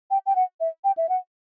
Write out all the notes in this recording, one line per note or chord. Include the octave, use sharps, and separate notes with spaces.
G5
G5
F#5
E5
G5
E5
F#5